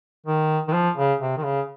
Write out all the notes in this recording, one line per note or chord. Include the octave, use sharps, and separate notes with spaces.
D#3
D#3
F3
C#3
C3
D#3
C#3